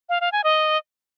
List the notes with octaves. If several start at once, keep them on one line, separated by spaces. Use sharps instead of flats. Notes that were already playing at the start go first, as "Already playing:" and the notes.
F5
F5
G#5
D#5